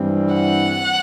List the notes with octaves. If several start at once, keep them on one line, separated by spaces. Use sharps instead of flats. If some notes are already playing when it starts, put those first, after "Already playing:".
Already playing: G2 E3 G3 C4
F#5